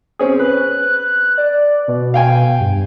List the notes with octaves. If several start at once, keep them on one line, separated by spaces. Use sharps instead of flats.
C4 C#4 G#4
B4 F#6
D5
B2
F5 G5 G#5
G2